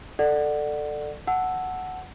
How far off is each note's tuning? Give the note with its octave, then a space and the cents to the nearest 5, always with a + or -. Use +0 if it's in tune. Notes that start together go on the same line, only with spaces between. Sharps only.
A4 +10 D5 +20 F#5 +0
F#5 +0 A5 +0 E6 +0